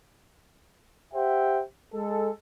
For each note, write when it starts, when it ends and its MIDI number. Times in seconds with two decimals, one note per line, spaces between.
1.14 1.62 67
1.14 1.62 72
1.14 1.62 76
1.14 1.62 78
1.14 1.62 79
1.94 2.29 56
1.94 2.29 69